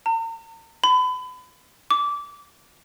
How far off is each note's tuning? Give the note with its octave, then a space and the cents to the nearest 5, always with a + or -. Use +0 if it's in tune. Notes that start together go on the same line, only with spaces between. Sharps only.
A#5 -45
B5 +35
D6 -20